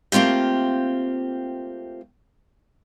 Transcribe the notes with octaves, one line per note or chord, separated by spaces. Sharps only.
A3 A#3 C4 F4 G4